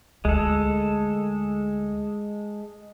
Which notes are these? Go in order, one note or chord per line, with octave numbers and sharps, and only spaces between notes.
D2 G#3 F4 A4